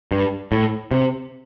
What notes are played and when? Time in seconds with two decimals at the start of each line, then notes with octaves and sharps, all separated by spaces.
0.12 G2
0.52 A2
0.91 C3